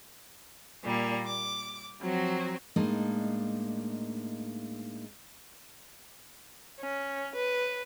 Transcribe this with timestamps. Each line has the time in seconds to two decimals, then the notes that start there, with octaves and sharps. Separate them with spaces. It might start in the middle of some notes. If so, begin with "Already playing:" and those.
0.84 A#2 G3 A#3
1.25 D6
2.00 F3 F#3 C4 F#4
2.76 A2 G#3 A#3 D4 D#4 D#5
6.81 C#4
7.35 B4